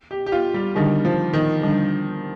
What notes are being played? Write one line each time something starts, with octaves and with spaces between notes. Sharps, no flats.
G4
G4
F4
G3
D3 D#3 G3 D4
F3
D#3
D3 G3 D4